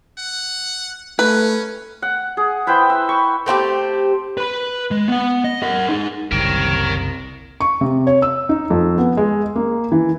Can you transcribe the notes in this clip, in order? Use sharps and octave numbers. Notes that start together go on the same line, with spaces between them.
F#5
A3 C#4 B4
F#5
G#4
E4 B4 C5 G5
E6
C#6
A3 C4 F4 G4
B4 B5
G#3
B3 F#5
D#5
A#4 F#5
D#4 G#4
F#1 C2 A#4 C#5 G5 A#5
C#6
C3
C#5
E6
D#4
F2
B3
G#3
A#3
E3